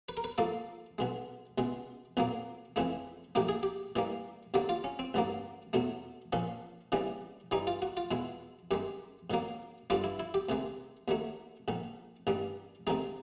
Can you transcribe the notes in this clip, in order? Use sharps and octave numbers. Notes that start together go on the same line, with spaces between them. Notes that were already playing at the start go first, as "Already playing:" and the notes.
B4
A#4
B4
G#2 F3 A#3 A4
B1 B2 G#3
C#2 B2 G#3
B1 A#2 F#3 A#3
F2 C#3 E3 A3
A#1 A2 F#3 A#3 G4
G#4
G4
A2 E3 G3 A#3
D#2 D3 F#3 A#3 G4
F4
C#4
C4
A1 G2 D3 F#3 A#3
E2 B2 F#3 A3
A#1 A#2 F3 C#4
D#2 C#3 E3 G3
G2 E3 G3 D#4
F4
F#4
F4
E2 B2 G#3 E4
F#2 D#3 G#3 G4
G#2 D#3 F#3 A#3
G2 D3 G3 F4
E4
E4
G4
D2 C3 D#3 G#3
D#2 D#3 F#3 A3
A#1 G#2 D#3
A1 G2 D#3 G3
D2 C3 D#3 G#3 D#4